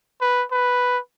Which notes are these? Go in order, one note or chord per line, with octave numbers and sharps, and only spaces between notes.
B4
B4